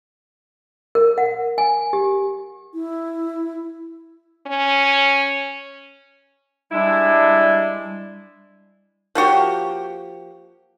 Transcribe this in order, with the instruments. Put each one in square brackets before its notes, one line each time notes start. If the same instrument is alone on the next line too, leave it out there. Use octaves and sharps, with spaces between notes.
[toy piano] A#4
F#5
G#5
G4
[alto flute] E4
[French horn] C#4
[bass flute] G3 [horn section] G#3 D4 E4
[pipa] F3 A#3 F#4 G4